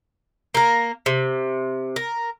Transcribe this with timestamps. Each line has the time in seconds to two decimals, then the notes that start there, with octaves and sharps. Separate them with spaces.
0.54 A#3 A#4
1.06 C3
1.96 A#4